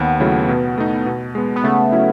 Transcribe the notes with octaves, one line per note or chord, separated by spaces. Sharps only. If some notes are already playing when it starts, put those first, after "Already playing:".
Already playing: D#2 B3
C#3 F#3 A3 E4
B2
A3 D#4
B2
G#3 B3
B3
C#3 A3
F#3 C#4 E4